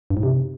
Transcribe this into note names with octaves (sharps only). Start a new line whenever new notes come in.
G2
G#2
C3